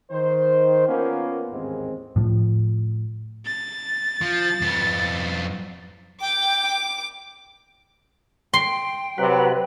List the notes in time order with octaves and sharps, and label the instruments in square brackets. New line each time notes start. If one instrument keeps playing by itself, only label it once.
[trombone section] D#3 C5
A#3 B3 C#4 F4 A#4
A1 D#2 G#2 G#3 C4
[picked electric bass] A2 F3
[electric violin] A6
[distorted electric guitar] F3
F2 B3
[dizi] G5 [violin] D6
[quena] G5 [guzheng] C6
[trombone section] C3 F#3 [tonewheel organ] B4 F#5